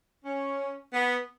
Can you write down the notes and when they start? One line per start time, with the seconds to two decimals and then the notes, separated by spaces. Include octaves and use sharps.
0.25 C#4
0.93 B3